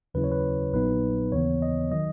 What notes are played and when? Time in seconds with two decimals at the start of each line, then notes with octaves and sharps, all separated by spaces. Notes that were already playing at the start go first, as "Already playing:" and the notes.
0.14 D#2 C#3 F#3 C#4 E4 B4
0.24 C#5
0.32 B4
0.73 A#1 A#2 F#3 B3 D#4 B4
1.32 D#2 C#3 E3 B3 C#5
1.62 D#5
1.91 D#3 F#3 D#5